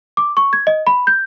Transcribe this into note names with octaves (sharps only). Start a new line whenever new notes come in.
D6
C#6
G#6
D#5
B5
G6